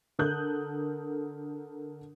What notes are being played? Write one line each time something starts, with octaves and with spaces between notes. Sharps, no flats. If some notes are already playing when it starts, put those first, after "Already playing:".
D3 A4 A#4 D#6 F#6 G6